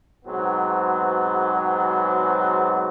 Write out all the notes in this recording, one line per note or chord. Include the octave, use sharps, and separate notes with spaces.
G#2 B2 F#3 B3 C4